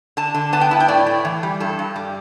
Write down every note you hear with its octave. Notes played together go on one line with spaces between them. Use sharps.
D3 A5
D3
B3 A5
G5
E4 A5
G5
A2 D5
A2
E3
G3
G2 A4
G2
G3